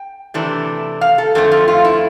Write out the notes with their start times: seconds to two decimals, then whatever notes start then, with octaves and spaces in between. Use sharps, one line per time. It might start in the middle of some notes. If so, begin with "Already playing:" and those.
Already playing: G5
0.34 C3 E3 A3 D4
1.01 F5
1.18 A4
1.35 F2 D3 A3 C4 A4
1.52 F4
1.68 F4
1.85 E4